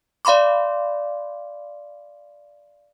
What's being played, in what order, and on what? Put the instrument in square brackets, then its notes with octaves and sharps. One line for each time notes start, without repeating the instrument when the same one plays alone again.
[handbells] D5 F5 B5 C6 D6